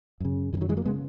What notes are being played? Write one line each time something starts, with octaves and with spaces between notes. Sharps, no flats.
F#2 C#3
F#2 C#3 E3
D#3 F#3
E3 G#3
F#3 A#3
C#3 G#3 B3